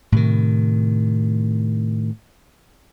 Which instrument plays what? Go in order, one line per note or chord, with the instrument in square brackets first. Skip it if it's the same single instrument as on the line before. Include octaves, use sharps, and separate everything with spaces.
[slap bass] A2 C3 D#3